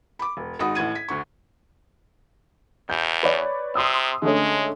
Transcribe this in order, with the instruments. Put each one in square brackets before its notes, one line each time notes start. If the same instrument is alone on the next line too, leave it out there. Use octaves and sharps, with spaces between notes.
[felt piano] B5 D6
E1
G#1 G#3 D#4 F#4 B5 D#6
A1 A2 F#5 G#6 D#7
B6
D2 D3 C#6
[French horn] E2 [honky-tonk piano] G6
[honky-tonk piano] B4 C#5 D5
[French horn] C3 [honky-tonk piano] C6 D#6 E6
[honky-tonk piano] D3 A3 C#4 [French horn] G#3